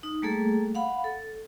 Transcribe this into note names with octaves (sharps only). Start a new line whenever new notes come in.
D#4
G3 A3 A#3 G#4 A4
F5 F#5 B5
A4